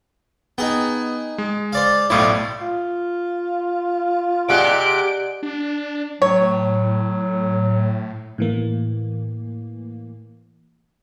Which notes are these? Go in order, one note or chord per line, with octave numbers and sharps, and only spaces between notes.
B3 D#4 G#4 G5
G#3
C5 D5 F5
B1 A2 E4 F4 C5 D5
F4
C3 G#3 G4 D5 F#5 F#6 D7
D4
A2 F#3 C#5
A2 E3 A#3